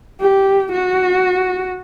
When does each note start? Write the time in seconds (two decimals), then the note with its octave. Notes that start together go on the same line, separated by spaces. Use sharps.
0.20 G4
0.72 F#4